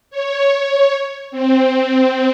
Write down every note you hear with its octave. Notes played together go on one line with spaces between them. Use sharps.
C#5
C4